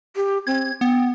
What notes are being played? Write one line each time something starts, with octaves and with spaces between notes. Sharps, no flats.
G4
C4 G#6
B3 G5